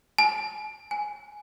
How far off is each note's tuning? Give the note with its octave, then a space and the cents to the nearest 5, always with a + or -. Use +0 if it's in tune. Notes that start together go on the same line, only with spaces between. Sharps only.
G#5 +45
G#5 +5